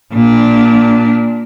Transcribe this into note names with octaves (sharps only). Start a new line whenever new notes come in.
A#2 D4